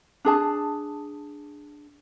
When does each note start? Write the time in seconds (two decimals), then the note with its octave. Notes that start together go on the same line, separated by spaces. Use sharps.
0.25 D4 G#4 A5